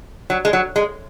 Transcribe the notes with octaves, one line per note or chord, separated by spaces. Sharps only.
F#3
G#3
F#3
G#3